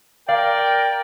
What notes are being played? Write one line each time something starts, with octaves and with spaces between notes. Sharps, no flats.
A#4 D5 F5 G5